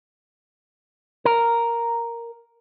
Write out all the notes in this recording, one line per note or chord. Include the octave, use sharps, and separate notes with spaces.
A#4